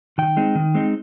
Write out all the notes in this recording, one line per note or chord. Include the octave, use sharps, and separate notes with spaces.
D#3 G5
G#3 C4 D#4
D#3
G#3 C4 D#4